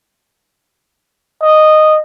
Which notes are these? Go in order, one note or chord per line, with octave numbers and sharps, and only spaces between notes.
D#5